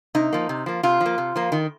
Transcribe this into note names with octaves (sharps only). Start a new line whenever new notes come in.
C3 D#4
F3 A#3
C3
F3 A#3
C3 F4
F3
A#3
C3
F3 A#3
D#3